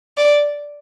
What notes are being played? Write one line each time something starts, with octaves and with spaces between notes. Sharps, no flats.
D5